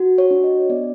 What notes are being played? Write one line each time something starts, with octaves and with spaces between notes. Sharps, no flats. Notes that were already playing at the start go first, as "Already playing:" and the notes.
Already playing: F#4
C#5
D4
D#5
B3 D5